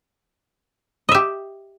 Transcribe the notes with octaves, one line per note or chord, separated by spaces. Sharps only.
G4 D#5 E5